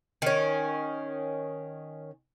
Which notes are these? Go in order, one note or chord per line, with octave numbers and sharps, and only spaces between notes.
D#3 C#4